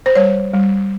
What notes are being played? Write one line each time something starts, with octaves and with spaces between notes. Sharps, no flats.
C5
G3 C#5
G3